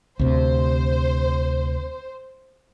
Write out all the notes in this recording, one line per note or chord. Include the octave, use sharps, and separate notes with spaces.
D2 C3 C5